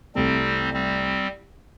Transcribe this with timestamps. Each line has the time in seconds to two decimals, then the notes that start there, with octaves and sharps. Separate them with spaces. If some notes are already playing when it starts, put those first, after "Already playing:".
0.15 C2 C3 G3 A3 C4
0.73 G3 C4